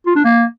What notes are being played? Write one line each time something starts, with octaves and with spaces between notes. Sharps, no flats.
F4
D4
A#3